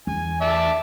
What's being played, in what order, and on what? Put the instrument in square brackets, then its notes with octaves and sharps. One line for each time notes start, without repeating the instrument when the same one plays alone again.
[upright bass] E2 [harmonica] G#5
[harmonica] D5 E5 A5